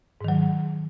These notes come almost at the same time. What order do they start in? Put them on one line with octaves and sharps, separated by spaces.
G#2 D#3 F#3